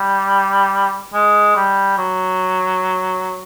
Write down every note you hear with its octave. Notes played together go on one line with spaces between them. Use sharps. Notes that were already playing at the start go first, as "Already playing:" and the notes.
Already playing: G3
G#3
G3
F#3